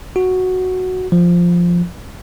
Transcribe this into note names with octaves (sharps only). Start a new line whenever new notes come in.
F#4
F3